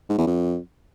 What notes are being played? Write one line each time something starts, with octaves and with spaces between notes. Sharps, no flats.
G#2
E2
F2